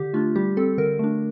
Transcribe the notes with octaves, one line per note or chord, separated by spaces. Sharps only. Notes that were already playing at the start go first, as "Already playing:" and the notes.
Already playing: D3 G4
A3 D4 F4
G3 G4
C4 A4
D3 A#4
A3 D4